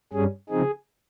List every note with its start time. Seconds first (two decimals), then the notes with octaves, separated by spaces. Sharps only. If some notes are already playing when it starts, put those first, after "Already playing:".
0.13 G2 G3 C#4 G#4
0.49 C#3 F3 C4 D#4 G#4